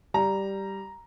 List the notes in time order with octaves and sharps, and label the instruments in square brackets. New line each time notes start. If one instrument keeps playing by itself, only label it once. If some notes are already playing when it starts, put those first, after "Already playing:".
[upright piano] G3 A#5